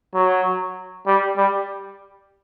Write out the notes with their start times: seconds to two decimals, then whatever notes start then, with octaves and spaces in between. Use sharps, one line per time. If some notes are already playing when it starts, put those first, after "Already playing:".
0.15 F#3
1.07 G3
1.37 G3